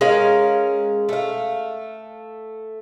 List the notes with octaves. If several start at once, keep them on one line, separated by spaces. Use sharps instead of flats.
G#3 C#4 A#4 F5
A3 F5